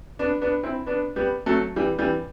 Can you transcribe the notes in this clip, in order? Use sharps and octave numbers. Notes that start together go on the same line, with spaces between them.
B3 D4
B3 D4
C4 E4
B3 D4
G3 B3
F#3 A3
E3 G3
E3 G3